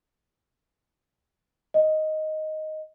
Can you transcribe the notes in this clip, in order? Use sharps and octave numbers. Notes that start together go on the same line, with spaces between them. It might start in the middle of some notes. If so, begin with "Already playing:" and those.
D#5